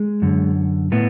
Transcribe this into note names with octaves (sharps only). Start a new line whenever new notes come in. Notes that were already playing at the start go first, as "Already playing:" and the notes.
Already playing: G#3
F#2 D3
A2 B3